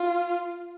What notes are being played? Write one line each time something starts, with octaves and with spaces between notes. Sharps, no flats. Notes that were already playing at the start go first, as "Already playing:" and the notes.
Already playing: F4